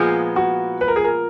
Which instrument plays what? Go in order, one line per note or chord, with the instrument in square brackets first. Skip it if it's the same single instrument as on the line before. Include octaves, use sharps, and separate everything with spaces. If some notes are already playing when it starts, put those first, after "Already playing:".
Already playing: [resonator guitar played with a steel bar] A#2 F3 G#3 B3 [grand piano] G#4
[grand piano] F#4
B4
A#4
G#4
A#4